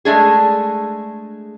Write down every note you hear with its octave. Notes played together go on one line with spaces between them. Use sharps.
G#3 A3 D4 G#4